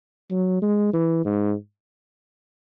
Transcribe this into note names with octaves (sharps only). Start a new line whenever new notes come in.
F#3
G#3
E3
G#2